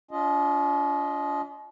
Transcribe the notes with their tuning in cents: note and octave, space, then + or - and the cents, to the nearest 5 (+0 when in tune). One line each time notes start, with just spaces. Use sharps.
D4 -45 F4 +0 D#5 +0